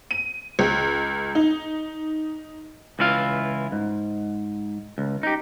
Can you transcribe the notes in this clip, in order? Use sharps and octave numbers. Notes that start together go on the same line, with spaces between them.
D#7
C#2
D#4
C#2 E3 E4 F4 F5
G#2
C#2
D#4 G4